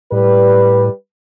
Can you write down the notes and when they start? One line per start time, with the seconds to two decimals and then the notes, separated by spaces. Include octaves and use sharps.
0.12 A2 G3 B4